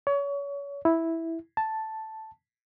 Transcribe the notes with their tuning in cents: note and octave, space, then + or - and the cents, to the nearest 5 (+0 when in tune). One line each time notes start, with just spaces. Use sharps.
C#5 +30
E4 -5
A5 +0